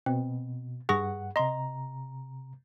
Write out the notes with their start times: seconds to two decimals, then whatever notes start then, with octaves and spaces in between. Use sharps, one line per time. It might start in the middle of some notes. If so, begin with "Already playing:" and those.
0.06 B2 C4
0.89 G2 G#4 F#5 C#6 A#6
1.36 C3 D#5 A#5 C6